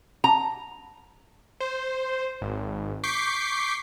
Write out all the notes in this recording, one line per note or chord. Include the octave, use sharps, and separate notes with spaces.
A#5
C5
G#1
C#6 D6 G6 B6 C7